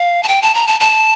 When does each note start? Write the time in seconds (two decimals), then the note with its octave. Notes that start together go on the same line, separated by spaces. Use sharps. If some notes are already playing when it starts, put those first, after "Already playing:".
Already playing: F5
0.23 A5
0.28 G5
0.42 A5
0.55 A#5
0.67 A5
0.80 A5